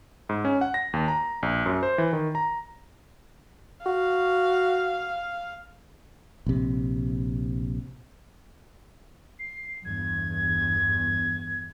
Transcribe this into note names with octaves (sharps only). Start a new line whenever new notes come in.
G#2
C#4
F#5
A#6
D#2
A#5
A#1
F#2
C5
E3
D#3
A#5
F#4 F5
A#1 C3
C7
E2 G2 G#6